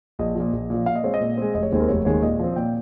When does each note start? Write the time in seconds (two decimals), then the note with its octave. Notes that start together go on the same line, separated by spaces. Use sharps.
0.19 A#1 D#5
0.35 A#2 F3
0.53 A#1
0.70 A#2 F3
0.86 A#2 F5
0.96 D#5
1.04 G#3 C4 C#5
1.14 D#5
1.21 A#2
1.37 G#3 C4
1.54 F1 D#5
1.63 C#5
1.72 D#2 D#3 G#3 C4 C5
1.80 A#4
1.89 F1 C#5
2.05 D#2 D#3 G#3 C4 C#5
2.22 A#2 D#5
2.39 F3 C4
2.56 A#2 G5